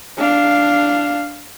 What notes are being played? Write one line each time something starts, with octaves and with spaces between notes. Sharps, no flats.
D4 F5